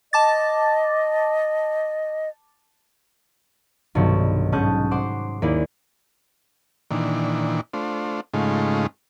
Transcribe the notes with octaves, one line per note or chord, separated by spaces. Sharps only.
D#5 A5 D6 A6
B1 G2 C3 D#3 F#3
G#2 C#4 A5 D#6 F#6 G6
C5 F#5 C6 D6
D#2 A#3 E4 G#4 D5
A#2 D#3 E3 D4
A3 D4 F4 C5
G#2 C#3 G#3 A3 D#4 F4